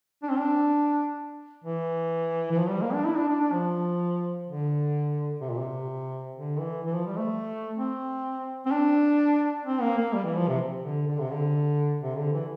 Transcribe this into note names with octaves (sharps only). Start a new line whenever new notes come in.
D4
C4
D4
E3
E3
F3
G3
A#3
D4
E4
D4
D4
D4
F3
D3
C3
A#2
C3
D3
E3
E3
F3
G3
A3
C4
C4
D4
C4
A#3
A#3
G3
E3
F3
C3
D3
D3
C3
D3
C3
D3
E3